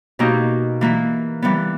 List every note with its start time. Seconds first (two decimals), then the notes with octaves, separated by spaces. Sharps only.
0.19 B2 A#3 D#4 G4
0.81 E3 A#3 E4
1.42 E3 G3 B3